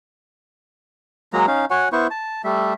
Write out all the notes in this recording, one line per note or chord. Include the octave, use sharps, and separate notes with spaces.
F#3 G#3 A#3 A#5
C#4 D#4 F5
F#4 C#5 F#5 G#5
B3 E4 C5 C#6
A5
G3 A3 E5